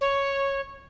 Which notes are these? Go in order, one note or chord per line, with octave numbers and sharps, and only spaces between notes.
C#5